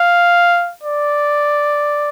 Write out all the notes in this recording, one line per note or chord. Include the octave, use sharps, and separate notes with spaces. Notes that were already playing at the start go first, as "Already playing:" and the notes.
Already playing: F5
D5